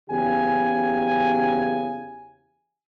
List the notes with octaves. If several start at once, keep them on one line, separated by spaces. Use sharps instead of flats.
F#1 E2 C#3 G4 G#5